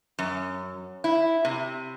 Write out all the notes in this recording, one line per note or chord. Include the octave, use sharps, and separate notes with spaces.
F#2
E4
C3